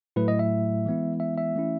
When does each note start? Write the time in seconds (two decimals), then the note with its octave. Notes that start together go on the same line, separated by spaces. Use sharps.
0.16 A2 F#3 A3 E4 B4
0.28 D#5
0.39 E5
0.86 E3 G#3 B3 E4
1.20 E5
1.38 E5
1.55 E3 A3 C#4 E4